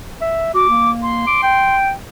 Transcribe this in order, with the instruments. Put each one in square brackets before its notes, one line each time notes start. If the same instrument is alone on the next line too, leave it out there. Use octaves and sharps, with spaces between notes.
[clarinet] E5
[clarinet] F#4 [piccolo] D6
[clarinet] A#3
[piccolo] C6
[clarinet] D6
G5